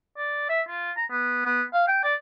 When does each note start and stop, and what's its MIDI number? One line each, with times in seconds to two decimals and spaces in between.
0.17 0.46 74
0.49 0.61 76
0.68 0.91 65
0.97 1.06 82
1.11 1.45 59
1.45 1.63 59
1.73 1.85 77
1.88 1.99 79
2.04 2.15 74